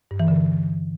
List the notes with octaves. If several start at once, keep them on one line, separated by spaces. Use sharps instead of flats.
G2
E3
D3